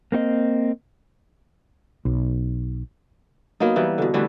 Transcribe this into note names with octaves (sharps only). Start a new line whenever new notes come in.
A#3 C4 F4 D#5
B1
F#3 A#3 B3 D#4
E3 G3
B2 D3
D3 E3 G3 A3